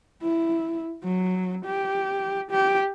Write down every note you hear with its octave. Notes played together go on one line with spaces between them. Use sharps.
E4
F#3
G4
G4